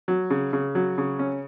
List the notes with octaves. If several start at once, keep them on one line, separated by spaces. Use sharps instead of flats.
F#3
C#3
C#3
F#3
C#3
C#4